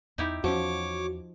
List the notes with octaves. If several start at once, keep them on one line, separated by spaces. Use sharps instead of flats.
E2 D#4 E4 G4
E2 F3 C#4 F#4 C#5 D6